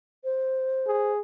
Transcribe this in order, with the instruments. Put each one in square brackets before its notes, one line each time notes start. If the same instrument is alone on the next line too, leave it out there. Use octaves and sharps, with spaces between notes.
[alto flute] C5
[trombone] G#4